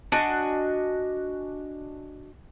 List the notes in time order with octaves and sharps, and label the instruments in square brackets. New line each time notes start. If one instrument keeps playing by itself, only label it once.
[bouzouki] D4 F#4 D#5 G#5